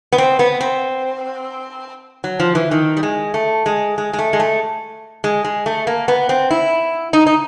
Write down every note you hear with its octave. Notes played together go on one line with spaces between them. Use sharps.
B3
C4
B3
C4
F#3
F3
E3
D#3
G3
G#3
A3
G#3
G#3
G#3
A3
G#3
A3
G#3
G#3
A3
A#3
B3
C4
E4
D#4
D#4